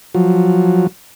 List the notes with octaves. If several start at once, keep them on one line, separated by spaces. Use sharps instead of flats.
F3 F#3